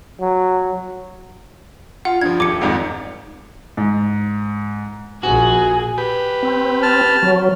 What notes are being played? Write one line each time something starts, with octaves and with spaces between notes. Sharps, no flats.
F#3
F4 F#5
G2 F3 G#6
D#1 D6 C#7
G#1 F2 G#2
G#2
A#1 F#4 G#4
G4 B4
C4
A5 F6
F#3